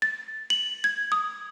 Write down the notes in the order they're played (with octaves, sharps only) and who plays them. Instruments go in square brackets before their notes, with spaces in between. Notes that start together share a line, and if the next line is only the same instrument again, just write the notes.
[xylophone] A6
F#7
G#6
D#6